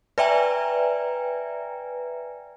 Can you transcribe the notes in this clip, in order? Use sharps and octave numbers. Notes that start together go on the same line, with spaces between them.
B4 D5 E5 G5 G#5 A#5